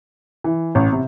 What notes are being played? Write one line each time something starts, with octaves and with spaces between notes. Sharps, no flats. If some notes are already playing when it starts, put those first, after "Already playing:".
E3
A1
C3